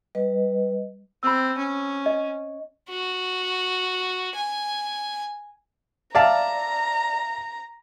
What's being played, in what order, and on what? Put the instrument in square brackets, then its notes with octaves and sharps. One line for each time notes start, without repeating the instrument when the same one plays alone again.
[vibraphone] G3 B4 D#5
[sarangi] C4 [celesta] B5 E6
[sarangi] C#4
[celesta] D#5
[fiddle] F#4
G#5
[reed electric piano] D5 [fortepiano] E5 F5 A5 [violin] A#5